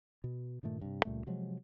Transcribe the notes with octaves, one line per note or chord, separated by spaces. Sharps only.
B2
G2 A#2 D#3 A3
G2 C3
C#2 A#2 G3 A3
C3 F3 F#3 G#3